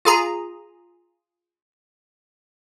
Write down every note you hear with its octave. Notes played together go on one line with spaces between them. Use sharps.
F4 G#4 A#5